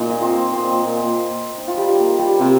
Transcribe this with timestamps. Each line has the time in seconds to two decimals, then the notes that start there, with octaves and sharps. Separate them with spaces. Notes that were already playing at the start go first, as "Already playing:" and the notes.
Already playing: A#2 D#4 A#4
0.10 D#5
0.22 C4 C5
0.53 A#2 C4 C5
0.84 A#2
1.58 D#4
1.68 F4
1.77 G3 G4
1.98 A#3 A#4
2.19 G3 G4
2.40 C3 A#3